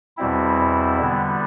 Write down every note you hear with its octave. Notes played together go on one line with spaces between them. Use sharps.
E2 B2 G3 C4 E4
D3 G3 B3